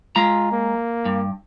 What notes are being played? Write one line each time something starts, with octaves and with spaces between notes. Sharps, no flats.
G#3 F4 A#5
A#3
G2